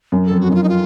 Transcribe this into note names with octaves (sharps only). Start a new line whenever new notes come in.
F#2
F2 A4
F#4
F#2 D#4
F4
D#4
F4